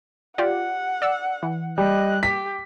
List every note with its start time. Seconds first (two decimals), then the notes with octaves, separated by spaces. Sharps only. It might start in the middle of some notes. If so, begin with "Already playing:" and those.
0.38 F4 G4 D5 F#5
1.02 D5 E6
1.43 E3
1.78 G3 D#5 F#6
2.23 G4 B6